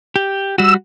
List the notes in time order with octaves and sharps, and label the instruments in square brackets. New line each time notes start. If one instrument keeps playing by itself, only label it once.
[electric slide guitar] G4
[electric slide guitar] G3 F#4 [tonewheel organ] E6